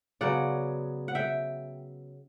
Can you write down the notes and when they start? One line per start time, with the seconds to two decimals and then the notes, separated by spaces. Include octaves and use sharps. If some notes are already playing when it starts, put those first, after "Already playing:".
0.21 C#3 F#3 B3 D5 F#5
1.08 F#5
1.15 E5 G5